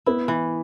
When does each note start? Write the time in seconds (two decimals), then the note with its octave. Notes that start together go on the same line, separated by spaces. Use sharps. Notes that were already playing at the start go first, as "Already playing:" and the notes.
0.06 B3 E4
0.28 E3